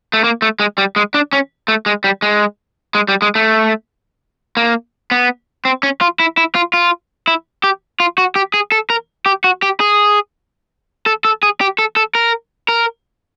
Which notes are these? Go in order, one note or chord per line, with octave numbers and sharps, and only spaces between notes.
A3
A#3
A3
G#3
G3
G#3
D4
C#4
A3
G#3
G3
G#3
G#3
G3
G#3
A3
A#3
B3
C4
C#4
F4
E4
E4
F4
F4
E4
G4
F4
F#4
G4
G#4
A4
A#4
G4
F#4
G4
G#4
A4
A4
G#4
G4
A4
A4
A#4
A#4